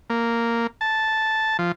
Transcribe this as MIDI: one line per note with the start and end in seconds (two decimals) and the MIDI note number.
0.10 0.67 58
0.81 1.57 81
1.59 1.72 53